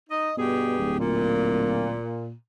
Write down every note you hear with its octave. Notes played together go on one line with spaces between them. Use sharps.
D#4 D#5
G2 B2 G4 G#4
D1
A#2